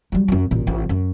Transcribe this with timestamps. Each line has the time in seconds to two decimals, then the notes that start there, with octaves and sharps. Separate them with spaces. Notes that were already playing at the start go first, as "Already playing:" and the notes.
0.12 F#3 G3
0.28 F#2 F#3
0.51 A1 A#2
0.67 A1 F3
0.89 F#2